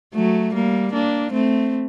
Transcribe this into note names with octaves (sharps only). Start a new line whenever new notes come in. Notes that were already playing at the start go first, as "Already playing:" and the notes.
F#3 A3
G3 A#3
A#3 D4
A3 C4